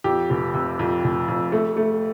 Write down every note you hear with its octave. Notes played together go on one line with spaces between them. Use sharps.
F2 G4
F1
C3
F2
F1
F2
A3
A3